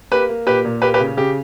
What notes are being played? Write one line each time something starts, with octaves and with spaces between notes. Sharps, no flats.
A#3 G4 B4
A#3
A#2 G4 B4
A#2
A#3 G4 B4
G4 B4
C#3
C#3 G4